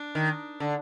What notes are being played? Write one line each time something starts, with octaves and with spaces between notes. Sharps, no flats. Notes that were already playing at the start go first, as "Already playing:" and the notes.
Already playing: D4
D#3
D3